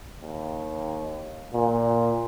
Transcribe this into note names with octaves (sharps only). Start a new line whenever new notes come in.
D#2
A#2